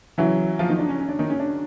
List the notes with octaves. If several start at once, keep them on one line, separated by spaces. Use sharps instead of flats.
C#3 E3 F#3 E4
F3 F4
D#3 D#4
D4
C#4
C#4
D4
D#3 D#4
C#4
D4